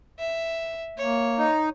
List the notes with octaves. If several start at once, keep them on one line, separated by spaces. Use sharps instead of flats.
E5
A#3 C#5
D#4